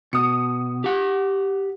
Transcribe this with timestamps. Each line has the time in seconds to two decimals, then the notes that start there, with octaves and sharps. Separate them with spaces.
0.13 B2 D#6 C#7
0.84 G4 F#5